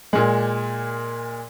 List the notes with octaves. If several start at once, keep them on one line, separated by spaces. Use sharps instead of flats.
A#2 G#3